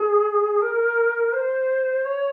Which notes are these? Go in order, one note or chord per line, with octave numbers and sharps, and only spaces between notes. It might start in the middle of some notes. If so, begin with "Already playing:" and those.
Already playing: G#4
A#4
C5
C#5